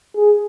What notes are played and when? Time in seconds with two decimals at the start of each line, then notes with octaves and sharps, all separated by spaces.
0.16 G#4